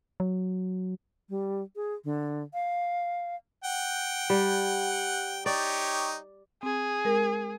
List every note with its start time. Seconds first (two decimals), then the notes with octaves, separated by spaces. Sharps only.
0.20 F#3
1.29 G3
1.76 G#4
2.04 D3
2.54 F5
3.64 F#5 G5
4.30 G3
5.46 D#4 G4 C#5 D5
6.63 C4 G#4
7.05 G#3 A#4